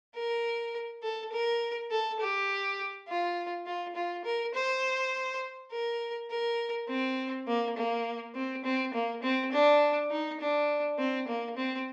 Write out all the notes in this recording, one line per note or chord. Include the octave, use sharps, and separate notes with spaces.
A#4
A4
A#4
A4
G4
F4
F4
F4
A#4
C5
A#4
A#4
C4
A#3
A#3
C4
C4
A#3
C4
D4
D#4
D4
C4
A#3
C4